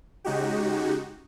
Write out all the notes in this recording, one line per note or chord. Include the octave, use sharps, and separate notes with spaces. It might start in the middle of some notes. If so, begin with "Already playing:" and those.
C#3 G#3 D#4 F#4 G4